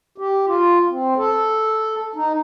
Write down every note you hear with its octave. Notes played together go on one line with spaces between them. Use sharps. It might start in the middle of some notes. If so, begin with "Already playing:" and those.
G4
F4
C4
A4
D#4